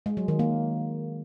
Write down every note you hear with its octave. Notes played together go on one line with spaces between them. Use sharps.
G#3
F#3
D#3
A#3